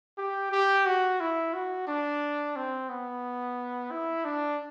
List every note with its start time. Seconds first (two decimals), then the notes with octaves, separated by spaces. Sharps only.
0.18 G4
0.52 G4
0.86 F#4
1.20 E4
1.54 F#4
1.87 D4
2.56 C4
2.89 B3
3.91 E4
4.24 D4